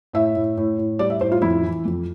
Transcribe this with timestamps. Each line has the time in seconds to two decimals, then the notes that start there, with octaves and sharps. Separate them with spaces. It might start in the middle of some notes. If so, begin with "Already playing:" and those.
0.13 A2 E5
0.36 A2
0.57 A2
0.78 A2
0.99 G3 D5
1.10 E5
1.21 A2 C5
1.32 F4
1.42 F2 E4
1.63 E3
1.85 F2